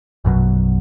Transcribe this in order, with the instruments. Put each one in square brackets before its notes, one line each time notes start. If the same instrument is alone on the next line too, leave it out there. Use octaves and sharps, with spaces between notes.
[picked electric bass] A#1 F#2 B2 F#3